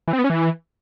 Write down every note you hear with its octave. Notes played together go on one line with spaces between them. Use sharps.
E3
C4
B3
C#4
E3